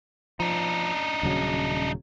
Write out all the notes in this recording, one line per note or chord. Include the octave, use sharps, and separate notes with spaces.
F3 D4 D#4
D#1 C#3 F#3